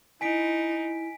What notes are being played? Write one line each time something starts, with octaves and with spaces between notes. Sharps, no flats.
D#4 E4 G#5 B6 D7